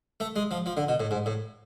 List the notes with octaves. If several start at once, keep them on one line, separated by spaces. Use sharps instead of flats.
A3
G#3
F3
F3
D3
B2
A2
G#2
A2